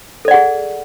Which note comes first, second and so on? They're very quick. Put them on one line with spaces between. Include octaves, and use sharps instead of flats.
A4 D5 F#5 G#4